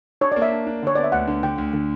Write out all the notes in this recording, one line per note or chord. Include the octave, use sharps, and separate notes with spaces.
D4 C#5
D5
A#3
E5
D4
D4
D3 C#5
B3 D5
E5
D2 F#5
D3
D3 G5
D2
D3